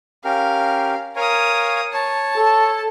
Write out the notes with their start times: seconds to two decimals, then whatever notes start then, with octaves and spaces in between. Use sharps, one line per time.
0.25 C#4 G4 A#4 F5
1.16 A#4 C#5 F5 G#5 D#6
1.93 C#5 A5
2.37 A4